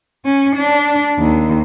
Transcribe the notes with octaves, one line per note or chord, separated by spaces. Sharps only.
C#4
D4
D#2